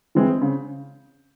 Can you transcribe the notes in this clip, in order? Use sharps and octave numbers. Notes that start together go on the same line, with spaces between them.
E3 G#3 C4
C#3